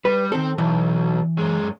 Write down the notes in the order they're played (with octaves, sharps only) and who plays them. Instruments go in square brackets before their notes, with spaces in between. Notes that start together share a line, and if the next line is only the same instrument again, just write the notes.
[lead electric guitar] G3 [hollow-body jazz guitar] B4
[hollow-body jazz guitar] D#3 A4 [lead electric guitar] C4
[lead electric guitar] B1 [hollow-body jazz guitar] E3
[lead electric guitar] F#2 G#3